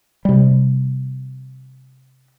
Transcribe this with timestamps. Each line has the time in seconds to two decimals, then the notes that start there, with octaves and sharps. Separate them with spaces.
0.25 C3 G3